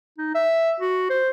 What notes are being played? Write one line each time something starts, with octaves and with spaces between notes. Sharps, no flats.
D#4
E5
F#4
C5